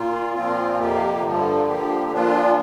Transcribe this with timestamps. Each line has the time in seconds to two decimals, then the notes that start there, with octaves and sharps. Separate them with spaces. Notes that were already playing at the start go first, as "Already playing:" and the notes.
Already playing: A#2 A#3 F4
0.34 A#2 F3 C4 F4
0.79 F2 C3 A#3 G4
1.23 G2 D3 F3
1.68 D3 F3 A#3 G4
2.11 A#2 F3 D4 F4